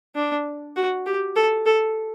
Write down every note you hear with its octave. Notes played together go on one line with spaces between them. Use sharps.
D4
F#4
G4
A4
A4